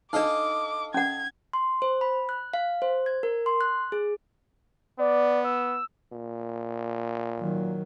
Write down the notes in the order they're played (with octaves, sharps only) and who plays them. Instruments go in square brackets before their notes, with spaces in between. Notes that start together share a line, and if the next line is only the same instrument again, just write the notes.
[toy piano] D4 D#4 [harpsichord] A4 D#5 F5 [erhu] D6
[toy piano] C#4 F#5 [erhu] G#6
[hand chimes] C6
C5
B5
F#6
F5
C5
G#6
A#4
C6
F#6
G#4
[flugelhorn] B3 [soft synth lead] D5
[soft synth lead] E6
[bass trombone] A#2
[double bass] D#3 F#3